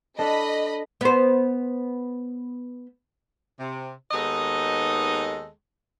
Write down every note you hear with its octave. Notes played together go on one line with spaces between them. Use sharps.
D4 A4 D#5 B5
B3 C5
C3
D#2 G#3 B3 D#4 A4 D#5